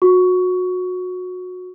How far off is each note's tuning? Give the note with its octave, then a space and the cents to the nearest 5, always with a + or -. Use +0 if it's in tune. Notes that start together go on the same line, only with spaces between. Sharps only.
F#4 -25 C#6 +15